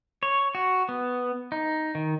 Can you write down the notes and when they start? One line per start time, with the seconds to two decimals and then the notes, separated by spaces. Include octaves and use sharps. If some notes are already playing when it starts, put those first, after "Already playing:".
0.23 C#5
0.55 F#4
0.89 B3
1.52 D#4
1.95 D#3